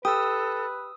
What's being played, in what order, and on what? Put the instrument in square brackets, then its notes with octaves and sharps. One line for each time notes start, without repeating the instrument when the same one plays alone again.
[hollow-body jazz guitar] G4 [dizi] A4 [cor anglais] B4 [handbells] D#6 E6